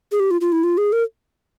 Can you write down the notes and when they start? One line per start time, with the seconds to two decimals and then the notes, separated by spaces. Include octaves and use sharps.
0.12 G#4
0.20 G4
0.31 F4
0.41 F4
0.52 E4
0.64 F4
0.78 G#4
0.92 A#4